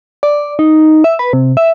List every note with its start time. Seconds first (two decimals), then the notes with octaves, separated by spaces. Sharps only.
0.23 D5
0.59 D#4
1.04 E5
1.19 B4
1.33 C3
1.57 E5